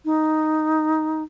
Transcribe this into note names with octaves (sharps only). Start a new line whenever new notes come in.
D#4